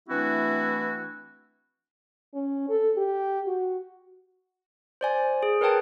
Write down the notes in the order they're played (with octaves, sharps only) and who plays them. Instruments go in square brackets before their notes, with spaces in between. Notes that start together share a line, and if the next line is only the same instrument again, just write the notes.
[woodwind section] E3 A3 C4 D4 E4 F#4
[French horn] C#4
A4
G4
F#4
[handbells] C5 D5 G#5
G#4
A#4 B4 C#5 G5 A5